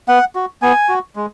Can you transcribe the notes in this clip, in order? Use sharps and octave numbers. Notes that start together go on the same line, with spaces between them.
B3 F#5
F#4
B3 G#5
F#4
G#3